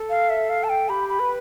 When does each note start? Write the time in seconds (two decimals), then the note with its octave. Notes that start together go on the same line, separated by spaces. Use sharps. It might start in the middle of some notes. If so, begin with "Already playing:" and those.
Already playing: A4
0.10 F5
0.30 E5
0.49 F5
0.64 A5
0.69 G5
0.89 G4 B5
1.09 B5
1.20 B4